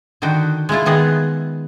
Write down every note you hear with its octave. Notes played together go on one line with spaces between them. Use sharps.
D3 D#3 D#4 F#4 G5
G#3 A#3 E4 F4
D#3 B3 G#4 D#5